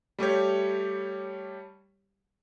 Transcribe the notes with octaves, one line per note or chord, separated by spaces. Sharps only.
G3 A3 G4 C#5